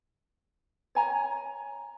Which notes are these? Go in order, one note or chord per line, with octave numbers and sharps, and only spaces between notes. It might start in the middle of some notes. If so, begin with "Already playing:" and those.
C#5 G#5 A#5